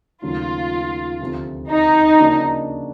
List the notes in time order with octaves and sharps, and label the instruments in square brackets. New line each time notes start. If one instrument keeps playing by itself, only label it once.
[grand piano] D#2 C#3 F#3 A3 [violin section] F4
[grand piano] D2 C3 F3
[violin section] D#4
[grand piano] C#3 F3 A#3 D4 F#4